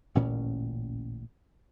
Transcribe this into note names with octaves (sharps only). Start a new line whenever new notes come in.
A1 D2 A#2 C#4